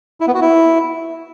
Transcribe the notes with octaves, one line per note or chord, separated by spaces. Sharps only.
E4
B3
F#4
E4